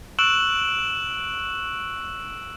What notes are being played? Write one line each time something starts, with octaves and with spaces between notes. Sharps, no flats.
C#6 E6 F#6 D7 E7 F#7